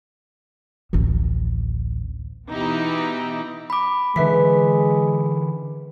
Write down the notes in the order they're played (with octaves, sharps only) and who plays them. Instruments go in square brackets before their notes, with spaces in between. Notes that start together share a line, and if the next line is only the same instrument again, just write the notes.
[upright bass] A1 D2
[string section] B2 E3 D#4 E4 G4
[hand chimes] B5 D6
[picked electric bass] D3 E3 [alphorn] G#3 [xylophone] B4 E5 B6